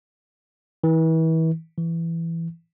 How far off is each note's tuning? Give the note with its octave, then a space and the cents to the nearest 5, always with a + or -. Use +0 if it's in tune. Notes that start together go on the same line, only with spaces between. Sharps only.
E3 -35
E3 +10